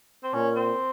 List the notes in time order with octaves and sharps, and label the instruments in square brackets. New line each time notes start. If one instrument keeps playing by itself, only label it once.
[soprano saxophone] C4
[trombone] A#2 [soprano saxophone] C#4
[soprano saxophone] C4